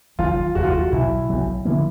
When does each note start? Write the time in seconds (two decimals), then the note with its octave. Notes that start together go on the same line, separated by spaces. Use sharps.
0.18 F1 D#2 D#3 F#3 F4
0.55 F1 D#2 D#3 F#3 F#4
0.63 F4
0.73 F#4
0.92 B1 B2 F#3 E4
1.29 B1 B2 F#3
1.65 D3 F3 A#3 E4